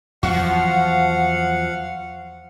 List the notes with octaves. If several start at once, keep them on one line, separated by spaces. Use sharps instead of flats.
E2 F3 F#3 F#4 F5 F#5